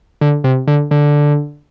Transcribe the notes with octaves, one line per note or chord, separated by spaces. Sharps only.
D3
C3
D3
D3